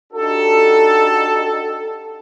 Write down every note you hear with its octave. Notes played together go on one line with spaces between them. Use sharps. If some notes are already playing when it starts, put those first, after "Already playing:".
D4 D#4 F#4 G4 A4